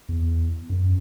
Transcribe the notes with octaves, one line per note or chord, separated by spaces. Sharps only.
E2
F#2